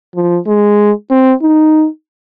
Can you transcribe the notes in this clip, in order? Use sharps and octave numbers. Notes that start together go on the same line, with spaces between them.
F3
G#3
C4
D#4